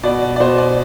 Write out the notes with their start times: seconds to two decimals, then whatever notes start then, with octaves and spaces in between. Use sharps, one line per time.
0.03 B2 D5
0.36 D5
0.40 B2 C5
0.58 D5